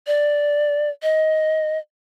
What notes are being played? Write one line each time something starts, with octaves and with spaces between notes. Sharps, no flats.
D5
D#5